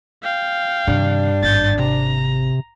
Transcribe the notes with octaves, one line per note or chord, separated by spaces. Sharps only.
F5 G5
G2 C3 D#3 D4
G#1 G6 A6
C3 A#5